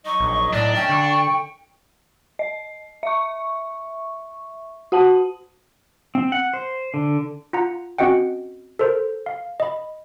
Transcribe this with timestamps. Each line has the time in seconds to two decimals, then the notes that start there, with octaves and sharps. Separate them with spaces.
0.06 F#3 D#4 D#5 C#6
0.20 A#1
0.53 A2 D4 D5
0.75 A3 C#4 G5
0.89 D3 C#6
2.39 D#5
3.03 E5 C#6
4.92 F#4 F#5 A5
6.15 C4
6.32 F#5
6.54 C5
6.94 D3
7.53 F4 F#5 A#5
7.98 C4 C#4 F#4 D#5 F#5 G5
8.79 A4 A#4 C5
9.26 F5
9.60 D#5 B5